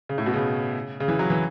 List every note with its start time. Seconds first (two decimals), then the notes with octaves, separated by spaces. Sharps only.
0.09 C#3
0.18 A2
0.26 B2
0.34 C#3
1.00 C#3
1.08 E3
1.19 F#3
1.30 E3